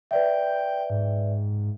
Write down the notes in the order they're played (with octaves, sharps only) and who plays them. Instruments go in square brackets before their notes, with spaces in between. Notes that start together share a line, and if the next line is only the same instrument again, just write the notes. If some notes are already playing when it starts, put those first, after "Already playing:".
[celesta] B4 D5 E5 [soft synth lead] G5
[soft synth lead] G#2